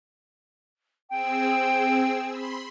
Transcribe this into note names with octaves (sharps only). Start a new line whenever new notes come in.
C4 G#4 G5 E6
B5 C6